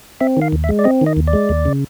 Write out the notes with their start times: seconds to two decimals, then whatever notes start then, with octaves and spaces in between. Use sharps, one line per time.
0.20 C4 E5
0.37 D#3 F5
0.52 D#2
0.64 E5
0.69 G#3
0.79 D5
0.84 C4 D#5
1.01 D#3 D#5
1.17 D#2
1.27 D5
1.33 G#3
1.49 D#2
1.65 C#3